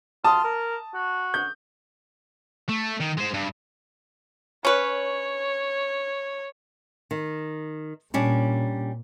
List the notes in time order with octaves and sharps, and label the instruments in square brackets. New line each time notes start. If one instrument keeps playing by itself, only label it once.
[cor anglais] F4 [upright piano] A5 D#6
[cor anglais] A#4
F#4
[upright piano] G6
[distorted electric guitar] A3
D#3
G#3 C5
G2
[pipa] C#4 B4 [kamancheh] C#5
[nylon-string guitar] D#3
[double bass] A#2 [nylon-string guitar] G3 C#4 D4